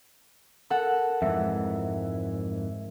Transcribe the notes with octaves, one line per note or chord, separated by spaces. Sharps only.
A4 A#4 F#5
F2 G#2 E3 G#3 E5